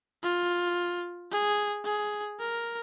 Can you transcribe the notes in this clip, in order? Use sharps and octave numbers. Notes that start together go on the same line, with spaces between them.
F4
G#4
G#4
A#4